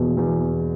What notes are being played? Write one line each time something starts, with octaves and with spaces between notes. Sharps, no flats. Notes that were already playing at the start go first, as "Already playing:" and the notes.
Already playing: E2 B2
E2